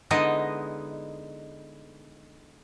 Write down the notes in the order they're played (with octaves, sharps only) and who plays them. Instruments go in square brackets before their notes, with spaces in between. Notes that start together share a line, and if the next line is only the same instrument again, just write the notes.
[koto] D3 G#3 B3 D#4 E4 D#5